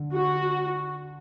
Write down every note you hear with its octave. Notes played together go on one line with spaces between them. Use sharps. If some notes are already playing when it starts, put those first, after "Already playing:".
Already playing: D3
F#4